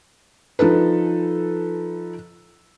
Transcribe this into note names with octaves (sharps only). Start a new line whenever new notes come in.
F3 D#4 A4 B4